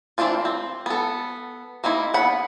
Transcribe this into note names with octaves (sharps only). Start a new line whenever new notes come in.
E3 G3 C4 D4 F4
C4
B3 A4
A#3 C4 D#4 E4
B3 F#5 B5